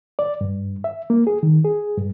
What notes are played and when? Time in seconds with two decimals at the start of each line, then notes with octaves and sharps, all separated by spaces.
0.19 D5
0.41 G2
0.84 E5
1.10 A#3
1.27 G#4
1.43 D#3
1.65 G#4
1.98 G2